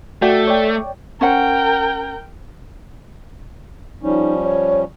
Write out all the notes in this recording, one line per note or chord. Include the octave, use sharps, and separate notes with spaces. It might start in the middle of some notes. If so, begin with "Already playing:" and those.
A3 F#4 D5 G5
C#5 D5 G5
C#4 A#4 C5 F#5 G5
F3 G3 C#4 D#4
C#5